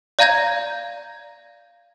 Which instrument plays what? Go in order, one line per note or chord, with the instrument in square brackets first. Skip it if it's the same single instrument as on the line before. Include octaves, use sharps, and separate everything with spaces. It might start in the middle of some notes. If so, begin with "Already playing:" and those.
[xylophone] D5 F5 A#5 G6 G#6 A#6